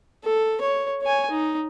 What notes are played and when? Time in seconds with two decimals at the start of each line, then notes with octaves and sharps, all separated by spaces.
0.24 A4
0.61 C#5
1.02 C#5 G#5
1.31 D#4